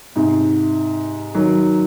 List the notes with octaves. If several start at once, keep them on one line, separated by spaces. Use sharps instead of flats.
G#2 C3
D#3 F#3